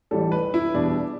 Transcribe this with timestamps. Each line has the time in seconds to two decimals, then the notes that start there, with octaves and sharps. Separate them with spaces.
0.11 A1 A2 E3 G3 A4
0.32 B4
0.54 E4
0.74 E2 B2 G3 D4